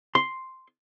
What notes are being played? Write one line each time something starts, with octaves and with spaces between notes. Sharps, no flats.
C6